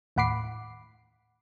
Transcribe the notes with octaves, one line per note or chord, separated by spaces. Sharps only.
D#2 A2 F#5 B5 D6 C7